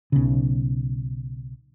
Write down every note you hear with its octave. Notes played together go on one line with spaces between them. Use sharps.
B1 C#3